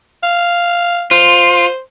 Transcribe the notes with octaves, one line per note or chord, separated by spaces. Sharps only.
F5
F4 C5